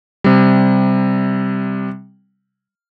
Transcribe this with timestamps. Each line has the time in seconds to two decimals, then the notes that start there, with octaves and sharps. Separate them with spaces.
0.24 C3 G3